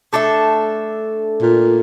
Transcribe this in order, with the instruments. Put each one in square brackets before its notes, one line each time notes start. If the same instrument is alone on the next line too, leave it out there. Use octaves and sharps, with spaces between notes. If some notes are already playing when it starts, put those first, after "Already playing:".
[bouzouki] A3 D4 A4 E5
[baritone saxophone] A#2